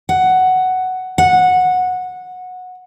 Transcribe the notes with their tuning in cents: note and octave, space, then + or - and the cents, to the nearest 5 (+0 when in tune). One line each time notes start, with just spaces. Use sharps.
F#5 +5
F#5 -15